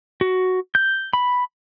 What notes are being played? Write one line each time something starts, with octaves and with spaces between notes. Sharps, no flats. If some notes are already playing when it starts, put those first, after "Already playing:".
F#4
G6
B5